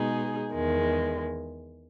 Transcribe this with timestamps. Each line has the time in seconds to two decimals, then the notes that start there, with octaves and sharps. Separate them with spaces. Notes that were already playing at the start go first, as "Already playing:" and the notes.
Already playing: B2 G#3 D#4 G#4
0.53 E2 D#3 G#3